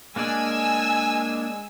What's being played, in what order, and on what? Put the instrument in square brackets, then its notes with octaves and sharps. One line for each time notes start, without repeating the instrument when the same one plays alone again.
[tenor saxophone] G#3 [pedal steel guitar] A#3 D4 D5 [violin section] G#5 E6